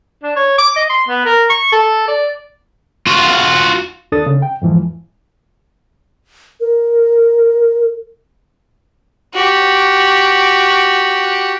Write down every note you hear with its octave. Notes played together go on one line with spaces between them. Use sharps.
D4
C#5
D6
D#5
C6
B3
A#4
C#6
A4
D5
F4 F#4
D#2 D4 A4 D#6 A6
C#3
G5
F2 G#2 E3 F3
A#4
F#4 G4